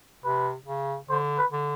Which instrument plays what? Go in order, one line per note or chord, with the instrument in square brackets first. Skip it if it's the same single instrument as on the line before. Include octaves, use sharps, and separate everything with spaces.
[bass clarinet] C3 [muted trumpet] B4
[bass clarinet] C#3
[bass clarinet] D3 [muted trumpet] C5
[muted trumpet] B4
[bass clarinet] D3